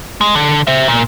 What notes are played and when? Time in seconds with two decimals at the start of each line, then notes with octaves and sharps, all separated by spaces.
0.21 G#3
0.35 D3
0.67 C5 E5
0.88 A#2